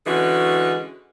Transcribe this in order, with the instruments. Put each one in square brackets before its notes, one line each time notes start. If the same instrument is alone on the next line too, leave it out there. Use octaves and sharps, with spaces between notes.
[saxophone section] D3 E3 G#3 C#4 F#4